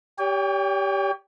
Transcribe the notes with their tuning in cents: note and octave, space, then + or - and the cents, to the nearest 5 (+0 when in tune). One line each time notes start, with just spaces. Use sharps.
G4 +0 C#5 +45 G5 +40